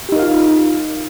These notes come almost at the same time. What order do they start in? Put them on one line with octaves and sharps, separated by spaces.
G4 D#4 A#4 F5 F4